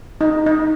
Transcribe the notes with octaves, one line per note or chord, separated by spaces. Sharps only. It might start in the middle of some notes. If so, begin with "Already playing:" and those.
D#4
D#4